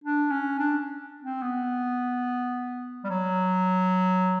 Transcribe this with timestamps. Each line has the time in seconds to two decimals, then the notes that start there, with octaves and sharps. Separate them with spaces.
0.04 D4
0.31 C#4
0.59 D4
1.22 C4
1.42 B3
3.04 G3
3.10 F#3